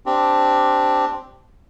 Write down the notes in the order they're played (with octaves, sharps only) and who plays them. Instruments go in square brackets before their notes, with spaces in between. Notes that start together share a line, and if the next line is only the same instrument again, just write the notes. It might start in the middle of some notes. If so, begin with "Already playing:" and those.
[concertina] C4 D4 G4